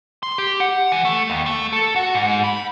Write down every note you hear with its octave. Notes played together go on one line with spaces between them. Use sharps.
C6
G4
F#5
E3
A3
D#2
A3
A4
F#4
G#2
B5